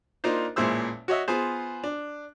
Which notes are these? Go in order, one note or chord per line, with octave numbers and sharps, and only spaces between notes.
A#3 D4 D#4 F4 C5
A1 A#2 G#3 E4 C5 E6
F#4 C#5 D#5 E5
B3 F4 G#4 C5
D4